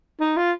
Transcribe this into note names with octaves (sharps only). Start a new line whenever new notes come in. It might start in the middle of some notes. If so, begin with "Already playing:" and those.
D#4
F4